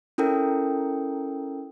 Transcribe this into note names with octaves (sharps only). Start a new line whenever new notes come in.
C#4 E4 A4 A#4 G5